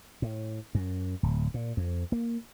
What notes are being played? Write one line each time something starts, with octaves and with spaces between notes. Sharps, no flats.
A2
F#2
D1
A#2
F2
A#3